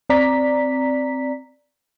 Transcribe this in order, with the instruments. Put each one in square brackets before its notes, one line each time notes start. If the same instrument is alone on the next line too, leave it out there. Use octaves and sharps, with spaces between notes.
[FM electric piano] C4 D5 A#5 B6